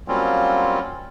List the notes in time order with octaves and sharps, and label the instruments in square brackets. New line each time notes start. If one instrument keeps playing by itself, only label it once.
[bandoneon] F#3 G3 A#3 C4 C#4 F4